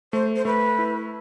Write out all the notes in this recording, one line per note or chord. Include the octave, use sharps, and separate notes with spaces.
A3 C5
C5
A3 B4
E4